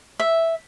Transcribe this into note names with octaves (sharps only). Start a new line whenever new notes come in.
E5